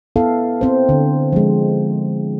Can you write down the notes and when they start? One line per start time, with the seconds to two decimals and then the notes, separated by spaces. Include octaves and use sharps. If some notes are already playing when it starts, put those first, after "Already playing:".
0.16 B3 E4 A4 F5
0.61 C4 C5
0.89 D3
1.32 F3 G#3